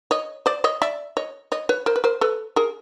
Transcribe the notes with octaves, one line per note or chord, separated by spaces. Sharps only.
C#5 D#5
C5 D5
C#5 D#5
D5 E5
C#5 D#5
C#5 D#5
B4 C#5
A#4 C5
B4
A#4 C5
A4 B4
G#4 A#4